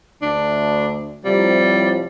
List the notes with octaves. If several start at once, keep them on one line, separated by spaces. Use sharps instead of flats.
D2 D4
A2 C3 F3 G3